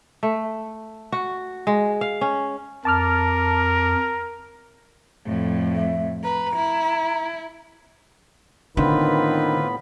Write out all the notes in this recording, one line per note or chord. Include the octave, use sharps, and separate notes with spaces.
A3
F#4
G#3
F5
C#4
F2 A#4 A5 D6 F6
F2 A2
E5
B4 A#5
E4
A2 D3 D#3 B3 C4 F4 B4 B5